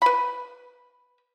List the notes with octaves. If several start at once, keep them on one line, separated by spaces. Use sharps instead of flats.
B4 B5